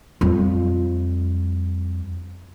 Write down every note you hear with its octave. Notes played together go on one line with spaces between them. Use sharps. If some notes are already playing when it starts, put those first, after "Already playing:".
F2 G3